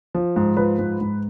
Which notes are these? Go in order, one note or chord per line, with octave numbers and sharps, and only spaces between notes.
F3
G#2
F3 B4
G#2
G#2